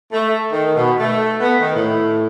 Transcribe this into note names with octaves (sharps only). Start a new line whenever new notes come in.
A3
D#3
B2
A3
B3
D#3
A2